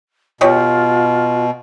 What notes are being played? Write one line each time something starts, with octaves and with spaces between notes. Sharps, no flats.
B2 F4 G4 C#5 D#5